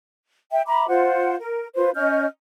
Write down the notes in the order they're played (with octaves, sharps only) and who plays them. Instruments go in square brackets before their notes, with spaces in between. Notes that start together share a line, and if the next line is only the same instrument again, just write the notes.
[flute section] E5 G5
E5 A#5 B5 D6
F4 C5 F#5
A#4
F4 B4 C5
C#4 D#5 F6 G6